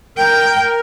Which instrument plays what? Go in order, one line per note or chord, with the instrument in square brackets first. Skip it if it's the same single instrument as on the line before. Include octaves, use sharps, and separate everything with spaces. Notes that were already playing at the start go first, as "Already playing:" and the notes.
[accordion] A#4 [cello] G5